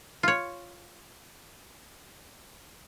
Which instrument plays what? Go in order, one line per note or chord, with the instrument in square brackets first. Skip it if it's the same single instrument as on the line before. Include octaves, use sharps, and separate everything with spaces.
[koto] F4 C#5